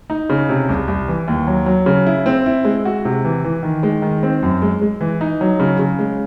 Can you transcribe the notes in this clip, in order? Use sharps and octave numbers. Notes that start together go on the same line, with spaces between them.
D#4
C#3
C3
C2
C2
E3
D#2
F#3
F#3
C#3
E4
C4
E4
G#3
F#4
C3
E3
E3
D#3
G#3
D#3
C4
F#2
G#3
G#3
E3
D#4
F#3
C#3
C#3
G#3